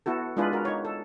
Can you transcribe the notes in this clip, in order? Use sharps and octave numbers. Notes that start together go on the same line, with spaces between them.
B3 E4 F#4 A4
G#3 D4 E4 F4 G#4 B4
F#4 A#4
D#4 C#5
A4